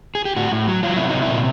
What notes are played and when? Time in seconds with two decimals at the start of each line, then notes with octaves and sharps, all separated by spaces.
0.15 G#4
0.25 G4
0.36 A2 F#4
0.52 A2
0.68 F#3
0.83 F#3 F4
0.97 C3 E4
1.09 C3 D#4
1.22 E4
1.30 A#2